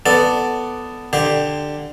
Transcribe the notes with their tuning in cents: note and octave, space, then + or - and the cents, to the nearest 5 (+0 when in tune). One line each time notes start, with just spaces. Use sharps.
B3 +5 A4 +0 D5 +0
D3 +15 G4 +0